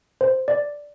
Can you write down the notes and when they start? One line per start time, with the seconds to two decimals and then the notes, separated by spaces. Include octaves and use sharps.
0.21 C5
0.48 D5